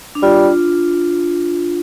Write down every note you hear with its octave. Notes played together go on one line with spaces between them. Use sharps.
D4
G3 F4